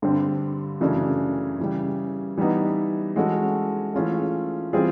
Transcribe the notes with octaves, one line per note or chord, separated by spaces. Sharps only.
G2 D3 G3 C4
F#2 C#3 E3 A3 D4
C#3 E3 G3
E3 G3 B3 D#4
E3 G#3 C#4 F#4 A4
E3 A3 C#4 F4 G#4
E3 G3 C4 F4 G#4